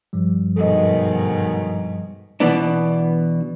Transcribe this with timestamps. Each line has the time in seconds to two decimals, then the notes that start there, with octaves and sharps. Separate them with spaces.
0.13 G2 F3 G3
0.56 D2 G#2 B2 D#3 F#3 A4 D#5
2.40 B2 E3 B3 D4